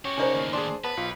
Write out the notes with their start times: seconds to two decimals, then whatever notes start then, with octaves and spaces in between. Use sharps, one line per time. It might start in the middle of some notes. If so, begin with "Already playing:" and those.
0.05 C#4 F#4 G4
0.17 C#3 D#4 A#4 C5 D5 G#5
0.34 D#2 A2
0.53 D4 G#4 A5 C6
0.84 B3 B4 A5 B5
0.97 B1 F4